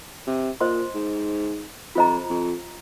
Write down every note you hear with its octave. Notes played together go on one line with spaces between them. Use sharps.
C3
A#2 C5 D#5 C6
G#2
F2 F4 C5 D#5 A#5
F2